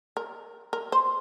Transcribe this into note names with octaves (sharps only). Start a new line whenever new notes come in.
A#4
A#4
C5